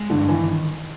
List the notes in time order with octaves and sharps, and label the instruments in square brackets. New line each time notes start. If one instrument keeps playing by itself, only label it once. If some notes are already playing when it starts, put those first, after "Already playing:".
Already playing: [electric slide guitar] G#3
[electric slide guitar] G2 [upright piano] D3
[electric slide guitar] D#3 [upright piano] E3